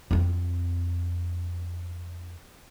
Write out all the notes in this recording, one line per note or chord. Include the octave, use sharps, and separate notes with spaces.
F2 C4